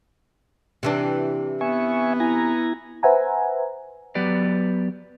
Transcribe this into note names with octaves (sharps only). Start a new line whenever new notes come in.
C3 E3 D4
B3 E5 G#5 C#6
E4 G#5 A#5
B4 C5 E5 F#5 G#5 A#5
F#3 B3 G4 B4 D5